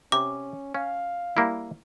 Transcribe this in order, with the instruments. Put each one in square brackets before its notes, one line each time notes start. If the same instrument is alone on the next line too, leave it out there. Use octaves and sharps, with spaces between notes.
[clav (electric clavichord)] C3 [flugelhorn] C#4 [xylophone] D6
[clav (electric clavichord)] C#4 [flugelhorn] F5
[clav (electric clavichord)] G3 A#3 E4